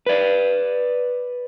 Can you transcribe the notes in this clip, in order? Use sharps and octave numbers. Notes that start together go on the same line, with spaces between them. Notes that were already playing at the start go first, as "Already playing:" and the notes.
B4 D5